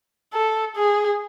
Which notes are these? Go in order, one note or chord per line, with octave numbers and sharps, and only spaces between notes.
A4
G#4